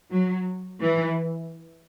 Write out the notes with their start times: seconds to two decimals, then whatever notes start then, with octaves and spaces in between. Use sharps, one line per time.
0.11 F#3
0.80 E3